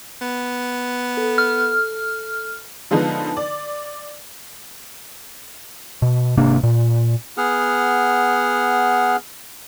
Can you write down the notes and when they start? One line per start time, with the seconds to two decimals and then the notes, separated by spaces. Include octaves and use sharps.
0.21 B3
1.17 A4
1.38 F6
2.91 D3 F3 G#3 B3 D#4
3.37 D5
6.02 B2
6.37 G#1 C3 A#3 D4
6.63 A#2
7.38 B3 G#4 F#5 F6